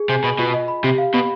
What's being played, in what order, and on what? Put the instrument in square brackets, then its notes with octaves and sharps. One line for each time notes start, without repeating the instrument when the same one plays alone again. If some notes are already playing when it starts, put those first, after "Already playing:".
Already playing: [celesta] G#4
[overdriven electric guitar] C3 [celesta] G#5
[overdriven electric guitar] B2 [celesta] B5
[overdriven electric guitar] B2 [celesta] F4
[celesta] D#5
B5
[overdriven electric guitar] C3 [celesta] G4
[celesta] F5
[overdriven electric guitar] B2 [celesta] B5